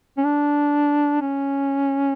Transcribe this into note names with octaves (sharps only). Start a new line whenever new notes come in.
C#4
D4
C#4